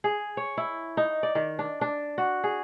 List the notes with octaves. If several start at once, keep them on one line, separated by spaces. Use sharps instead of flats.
G#4
C#5
E4
D#4
D5
D#3
D4
D4
F#4
G#4